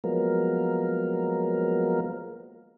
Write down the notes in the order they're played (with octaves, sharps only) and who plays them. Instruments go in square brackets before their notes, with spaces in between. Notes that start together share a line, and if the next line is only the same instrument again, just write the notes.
[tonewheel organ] F3 F#3 G#3 A#3 B3 A#4